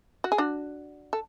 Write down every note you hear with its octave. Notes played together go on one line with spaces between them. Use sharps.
F#4
G#4
D4 F#4
A4